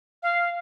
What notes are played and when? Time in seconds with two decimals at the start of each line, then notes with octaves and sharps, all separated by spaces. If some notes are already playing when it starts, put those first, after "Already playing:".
0.23 F5